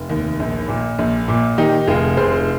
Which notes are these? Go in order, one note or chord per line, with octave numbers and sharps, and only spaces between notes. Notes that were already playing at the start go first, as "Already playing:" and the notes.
Already playing: F1
D#2
A#1
A#2
A#1
A#2
D#3 D#4 G4
F1 F4 G#4
F1 G#4 C5